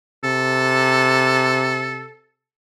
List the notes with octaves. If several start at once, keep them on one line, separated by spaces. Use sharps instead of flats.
C3 A4